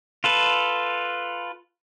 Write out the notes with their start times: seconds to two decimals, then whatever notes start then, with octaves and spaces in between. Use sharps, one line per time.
0.24 F4 A4 B4